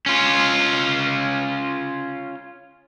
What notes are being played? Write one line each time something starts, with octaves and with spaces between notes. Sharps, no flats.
C#4 F4